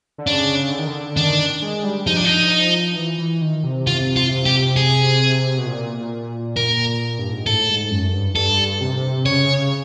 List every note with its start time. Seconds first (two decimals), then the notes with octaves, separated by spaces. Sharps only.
0.18 D3
0.27 C#3 D4
0.71 D3
0.79 D#3
0.87 D3
1.16 D#3 D4
1.62 G#3
1.84 G3
2.06 F3 D#4
2.16 D4
2.25 D#4
2.96 E3
3.18 E3
3.42 D#3
3.64 C3
3.87 F4
4.16 F4
4.46 G4
4.76 G#4
5.58 B2
5.66 A#2
6.57 A#4
7.19 G2
7.32 G#2
7.45 A2 A4
7.69 G#2
7.90 F#2
8.13 G2
8.36 G2 A4
8.81 C3
9.26 C#3 C#5